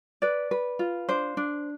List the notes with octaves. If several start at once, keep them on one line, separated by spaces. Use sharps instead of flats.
B4 D5
B4
F4
D4 C5
D4